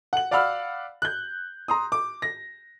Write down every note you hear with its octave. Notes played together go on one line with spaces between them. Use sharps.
F#5 F#7
D5 F5 F#5 B5 E6 F6
F#6 G6
A#5 C6 D#6
D6
A#6